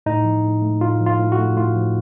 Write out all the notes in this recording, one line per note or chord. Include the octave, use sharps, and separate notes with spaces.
A2 D#4
F3
A2
A3
A2 F4
F3
F4
A2
F#4
A3
A2 F4
F3